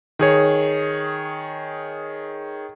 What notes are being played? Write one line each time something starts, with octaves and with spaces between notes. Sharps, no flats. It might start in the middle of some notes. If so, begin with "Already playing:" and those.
D#3 G#4 C#5